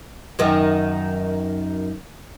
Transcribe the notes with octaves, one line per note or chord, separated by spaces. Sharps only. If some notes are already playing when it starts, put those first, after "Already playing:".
F#2 D#3